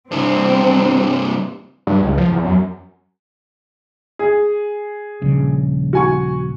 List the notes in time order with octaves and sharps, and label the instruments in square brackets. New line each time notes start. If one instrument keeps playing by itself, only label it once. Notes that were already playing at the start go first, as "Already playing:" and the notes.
[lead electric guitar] C2 G2 [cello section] C4
[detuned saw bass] G2
C#2
F3
E2
F#2
[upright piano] G#4
[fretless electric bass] D#1 A#1 C#3
[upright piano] F#4 G#5 C#6